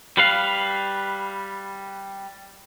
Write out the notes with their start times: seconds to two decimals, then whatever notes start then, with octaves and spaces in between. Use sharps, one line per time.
0.17 G3 B4 F5